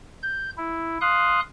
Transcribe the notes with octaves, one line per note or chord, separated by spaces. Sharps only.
G6
E4
F5 C6 D#6 F#6